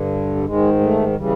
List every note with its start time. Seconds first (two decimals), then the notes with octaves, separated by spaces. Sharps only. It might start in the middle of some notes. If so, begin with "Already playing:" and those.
Already playing: G2 D3
0.36 G3
0.44 G#2 D#3 G#3
0.80 A3
1.16 C#3 E3 G3